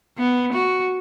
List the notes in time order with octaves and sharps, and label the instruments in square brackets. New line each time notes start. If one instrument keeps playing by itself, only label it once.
[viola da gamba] B3
F#4